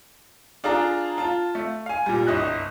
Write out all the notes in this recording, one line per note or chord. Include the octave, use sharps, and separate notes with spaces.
D4 F4 G#4 F5 A#5
F4 A5
A3
F5 G#5
A#2 G3
G1 C2 D#5 F#6